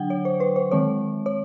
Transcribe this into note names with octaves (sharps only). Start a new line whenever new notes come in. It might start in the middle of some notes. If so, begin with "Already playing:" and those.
Already playing: D3 F#3 D4 F#5 G5
C#5
C5
B4
C5
D#3 G#3 C4 C#5
C#5